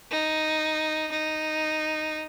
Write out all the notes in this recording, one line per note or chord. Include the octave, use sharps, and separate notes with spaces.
D#4
D#4